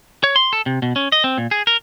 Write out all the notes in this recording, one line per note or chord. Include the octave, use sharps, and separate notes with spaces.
C#5
C6
A4
C3
B2
C#4
D#5
C4
A#2
G#4
A#4